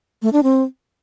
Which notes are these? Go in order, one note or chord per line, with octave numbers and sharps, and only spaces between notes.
A3
D4
C4